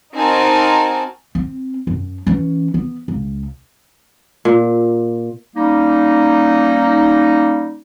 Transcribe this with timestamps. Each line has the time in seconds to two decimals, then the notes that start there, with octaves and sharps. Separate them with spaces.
0.15 C4 D#4 F#4 A#4 G#5 A5
1.35 C4
1.87 F#2
2.27 E3 C#4
2.74 B3
3.08 C#2
4.45 A#2
5.56 G3 A#3 C#4 D#4